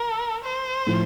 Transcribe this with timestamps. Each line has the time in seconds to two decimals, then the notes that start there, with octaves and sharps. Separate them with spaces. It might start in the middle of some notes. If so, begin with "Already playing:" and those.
Already playing: A#4
0.44 C5
0.87 A2 F3